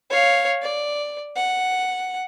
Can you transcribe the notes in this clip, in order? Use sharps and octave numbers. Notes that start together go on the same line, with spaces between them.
C#5 F5
D5
F#5